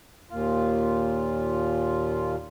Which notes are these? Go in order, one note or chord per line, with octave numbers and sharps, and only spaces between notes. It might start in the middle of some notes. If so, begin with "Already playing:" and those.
D#2 A#2 F4